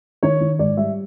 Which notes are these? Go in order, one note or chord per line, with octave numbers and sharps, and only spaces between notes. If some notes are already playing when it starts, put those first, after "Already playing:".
D#3 C#5
D#3
G#2 D5
G3 E5